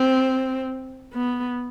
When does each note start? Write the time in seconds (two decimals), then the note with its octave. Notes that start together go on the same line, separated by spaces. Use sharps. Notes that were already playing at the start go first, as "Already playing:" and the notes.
Already playing: C4
1.14 B3